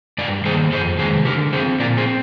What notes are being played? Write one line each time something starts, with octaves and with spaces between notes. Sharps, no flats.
G2 A#4 D5
D#3 A#3 G#4 C5
F2 G#4 C5
C3 D#3 G#3 G#4 C5
D3 G4 A#4
F3 C4 G#4 C5
A#2 A#4 D5
G#4 C5
C4